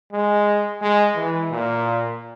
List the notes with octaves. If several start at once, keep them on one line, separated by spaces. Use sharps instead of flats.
G#3
G#3
E3
A#2